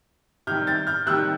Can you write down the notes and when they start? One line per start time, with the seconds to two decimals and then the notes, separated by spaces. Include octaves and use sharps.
0.47 C3 D#3 G3 F6 G6
0.67 G6 A6
0.87 F6 G6
1.06 C3 D#3 G3 E6 F#6